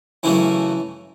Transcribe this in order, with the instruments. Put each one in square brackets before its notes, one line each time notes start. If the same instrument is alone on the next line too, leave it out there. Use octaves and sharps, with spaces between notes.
[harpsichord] F#2 C#3 E3 F#3 A3 E4